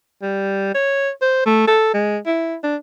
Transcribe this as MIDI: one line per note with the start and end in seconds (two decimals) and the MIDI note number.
0.22 0.72 55
0.75 1.10 73
1.21 1.43 72
1.46 1.66 57
1.68 1.93 69
1.94 2.18 56
2.26 2.55 64
2.64 2.76 62